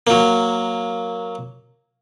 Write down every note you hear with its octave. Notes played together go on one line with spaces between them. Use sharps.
F#3 A#3